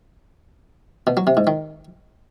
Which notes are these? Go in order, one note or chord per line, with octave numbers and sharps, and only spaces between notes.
B2
F#3
C3
G#2
D#3